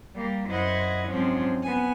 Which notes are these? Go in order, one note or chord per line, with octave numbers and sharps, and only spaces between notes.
G3 A#3
F#2 E4 C5 D#5 F#5 G#6
G#2 F3 F#3 C4 C#4
B3 G#5